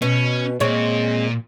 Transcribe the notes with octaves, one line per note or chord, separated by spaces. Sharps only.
B2 C#4
A#2 G#3 C4 C#5